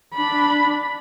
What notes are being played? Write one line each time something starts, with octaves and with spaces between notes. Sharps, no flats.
D4 B5